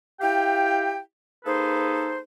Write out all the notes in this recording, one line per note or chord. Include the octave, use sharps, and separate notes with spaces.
E4 G4 F5 G5
A#3 D#4 G#4 A4 B4 C5